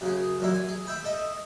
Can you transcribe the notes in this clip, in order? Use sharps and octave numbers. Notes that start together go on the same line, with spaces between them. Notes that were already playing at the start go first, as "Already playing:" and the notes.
F#2 C#3 G#4
F#2 A#2 E4
G#5
G#4
E5 G5 B5
A4 D#5 E5